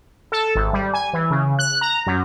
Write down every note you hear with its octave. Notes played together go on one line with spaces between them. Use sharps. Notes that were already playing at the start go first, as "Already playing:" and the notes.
A4
G#1
G3
G#5
E3
C#3
F#6
A#5
F#2